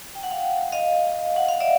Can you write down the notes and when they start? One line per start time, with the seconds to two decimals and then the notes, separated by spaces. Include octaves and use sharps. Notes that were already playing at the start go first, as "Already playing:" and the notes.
0.15 G5
0.23 F#5
0.30 F5 G5
0.72 D#5 F5
1.36 F#5
1.48 F5
1.60 D5 E5